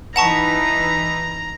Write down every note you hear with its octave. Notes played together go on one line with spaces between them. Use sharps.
E3 D#4 B4 F#5 A5 A#5 C#6